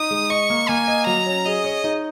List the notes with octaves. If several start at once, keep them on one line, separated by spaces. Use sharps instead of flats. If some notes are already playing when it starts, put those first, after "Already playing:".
Already playing: D#4 D#6
G#3
D#5 C#6
A#3
A#3 G#5
D#5
F#3 A#5
C#4
G#4 D#5
C#5
D#4